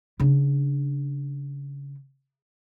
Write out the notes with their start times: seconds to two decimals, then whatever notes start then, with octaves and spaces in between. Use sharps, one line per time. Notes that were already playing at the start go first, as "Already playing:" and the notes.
0.20 C#3 D4